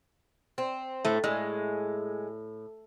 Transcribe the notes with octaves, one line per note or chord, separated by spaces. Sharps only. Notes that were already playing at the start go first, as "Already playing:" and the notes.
C4
A2 A3
A2 G#3